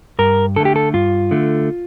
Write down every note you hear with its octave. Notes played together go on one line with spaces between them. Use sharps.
G2 A#4
D3 A3 A4
G4
A4
G2 F4
D3 A3